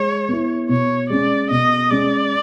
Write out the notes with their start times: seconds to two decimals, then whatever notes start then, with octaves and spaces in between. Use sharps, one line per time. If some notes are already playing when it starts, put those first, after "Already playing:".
Already playing: G#3 C#5
0.29 B3 E4
0.69 B2 C#5
1.10 G#3 C#4 D5
1.51 B2 D#5
1.90 G#3 C#4 D5